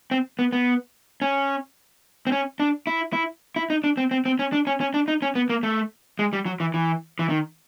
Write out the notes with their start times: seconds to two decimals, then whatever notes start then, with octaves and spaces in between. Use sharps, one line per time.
0.11 C4
0.39 B3
0.53 B3
1.22 C#4
2.27 C4
2.32 C#4
2.60 D4
2.87 E4
3.13 E4
3.56 E4
3.70 D#4
3.84 D4
3.97 C4
4.11 C4
4.26 C4
4.39 C#4
4.53 D4
4.67 C#4
4.81 C#4
4.94 D4
5.08 D#4
5.22 C#4
5.35 B3
5.50 A#3
5.63 A3
6.19 G#3
6.33 G3
6.46 F#3
6.60 E3
6.74 E3
7.19 E3
7.29 D#3